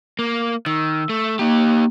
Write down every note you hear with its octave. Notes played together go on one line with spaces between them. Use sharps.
A#3
D#3 E6
A3
A#3 D#4 G4